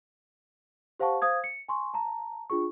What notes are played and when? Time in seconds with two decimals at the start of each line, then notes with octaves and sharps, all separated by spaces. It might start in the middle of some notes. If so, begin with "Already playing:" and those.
1.00 G4 C5 F5 F#5 A5 C#6
1.22 C5 F5 D#6 G#6
1.44 C#7
1.68 G#5 C6 C#6
1.94 A5 A#5
2.50 D4 F4 G#4 C#6